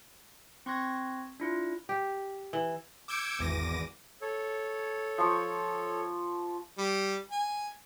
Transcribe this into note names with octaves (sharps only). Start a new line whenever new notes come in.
C4 C6 C#6 F#6 G#6 A#6
D4 E4 F4
G4
E3
D6 E6 G6 G#6 C#7 D7
G#1 E2 D6 A#6 D#7
A4 C#5
F3 C#6
G3
G#5